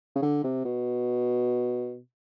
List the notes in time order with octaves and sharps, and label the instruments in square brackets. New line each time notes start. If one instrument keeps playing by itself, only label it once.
[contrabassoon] C#3
D3
C3
B2